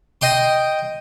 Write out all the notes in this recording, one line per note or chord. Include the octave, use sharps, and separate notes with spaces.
D#5 G5 C6